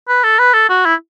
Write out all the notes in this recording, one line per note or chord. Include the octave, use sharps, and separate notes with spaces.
B4
A4
B4
A4
F#4
E4